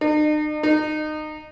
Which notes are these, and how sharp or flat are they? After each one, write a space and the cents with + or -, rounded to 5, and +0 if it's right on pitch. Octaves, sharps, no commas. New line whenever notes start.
D#4 -45
D#4 -25